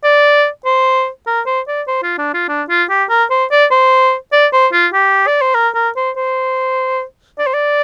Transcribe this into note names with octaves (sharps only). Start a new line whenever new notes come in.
D5
C5
A#4
C5
D5
C5
F4
D4
F4
D4
F4
G4
A#4
C5
D5
C5
D5
C5
F4
G4
D5
C5
A#4
A#4
C5
C5
D5
C5
D5